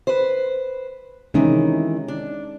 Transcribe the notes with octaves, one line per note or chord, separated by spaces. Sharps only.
B4 C5
C3 D#3 E3 G#3 C#4 D#4
D4